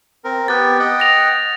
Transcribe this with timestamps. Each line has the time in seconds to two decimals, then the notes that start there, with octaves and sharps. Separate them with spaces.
0.24 C4 A#4
0.48 B3 G4 F#6 A6
0.79 D#5 F#5 G5
1.00 A#6 F7